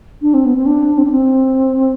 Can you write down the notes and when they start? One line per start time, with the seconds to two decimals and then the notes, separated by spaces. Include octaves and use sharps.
0.22 D4
0.34 C4
0.45 B3
0.56 C4
0.66 D4
0.98 C4
1.05 D4
1.12 C4